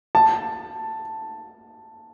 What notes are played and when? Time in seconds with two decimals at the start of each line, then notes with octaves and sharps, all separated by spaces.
0.15 A5